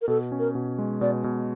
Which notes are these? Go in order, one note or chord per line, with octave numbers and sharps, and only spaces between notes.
A#4
B2 A4
C#4
A#4
B2
G#3
B2 D5
B2